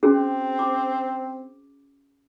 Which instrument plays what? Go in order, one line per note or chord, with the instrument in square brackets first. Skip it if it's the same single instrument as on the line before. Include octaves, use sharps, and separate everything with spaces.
[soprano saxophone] C4 [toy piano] C#4 F#4 G#4
[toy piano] D6